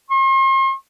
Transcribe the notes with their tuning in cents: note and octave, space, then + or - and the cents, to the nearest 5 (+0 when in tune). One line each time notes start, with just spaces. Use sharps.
C6 +45